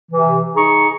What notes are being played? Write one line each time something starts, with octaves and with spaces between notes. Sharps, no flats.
C3 E3
D#4 G#4 A#5 C#6